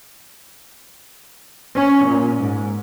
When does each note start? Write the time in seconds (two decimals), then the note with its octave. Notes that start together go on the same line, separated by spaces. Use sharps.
1.74 C#4
2.06 A#2
2.38 G#2